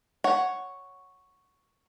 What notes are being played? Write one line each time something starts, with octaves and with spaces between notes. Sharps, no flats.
C#5 F#5